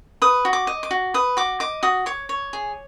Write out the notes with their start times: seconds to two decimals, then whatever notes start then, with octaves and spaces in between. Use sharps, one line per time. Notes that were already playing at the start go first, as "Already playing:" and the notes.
0.22 B4 D#6
0.45 F#4
0.53 D6
0.67 D#5
0.83 D6
0.91 F#4
1.14 B4 D#6
1.37 F#4 D6
1.60 D#5 D6
1.83 F#4 D#6
2.06 C#5 D6
2.29 C#5
2.53 G#4